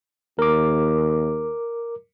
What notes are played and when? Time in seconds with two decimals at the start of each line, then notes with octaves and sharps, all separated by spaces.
0.39 D#2 A#4 D6